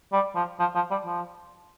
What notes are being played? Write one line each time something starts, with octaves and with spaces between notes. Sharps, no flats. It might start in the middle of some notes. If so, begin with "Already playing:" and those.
G3
F3
F3
F3
G3
F3